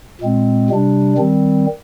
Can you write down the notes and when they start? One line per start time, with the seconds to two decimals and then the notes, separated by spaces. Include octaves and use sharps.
0.21 A#2 G#3 C4
0.70 C3 G3 D4
1.18 D#3 G3 C4